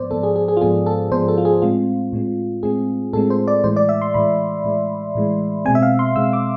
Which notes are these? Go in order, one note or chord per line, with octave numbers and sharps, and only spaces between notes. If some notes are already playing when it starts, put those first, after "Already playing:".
Already playing: G#2 F3 B3 C5 D5
G#2 F3 B3 A4
G#4
G#4
G#4
F4
G#2 F3 B3 G#4
A4
G#2 F3 B3 C5
A4
F4
G#4
A2 G#3 C4 F4
A2 G#3 C4
A2 G#3 C4 G#4
A2 G#3 C4 A4
C5
D5
A2 E3 G#3 C5
D5
E5
C6
A2 E3 G#3 B5
A2 E3 G#3
A2 E3 G#3
B2 G#3 C4 G#5
E5
F5
C6
B2 G#3 C4 E6
D6